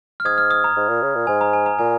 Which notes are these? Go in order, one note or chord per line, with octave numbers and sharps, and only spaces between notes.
F6
G#2 D#6 G#6
F6
D#6
A#5
G#2
A#2
C#3
A#2
G#2 G#5
A#5
G#5
A#5
A#2 G#5